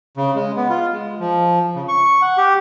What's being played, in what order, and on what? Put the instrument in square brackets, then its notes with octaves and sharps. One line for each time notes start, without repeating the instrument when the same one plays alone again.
[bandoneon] C#3
G#3
B3
F4
G#3
F3
C#3
C#6
F#5
G4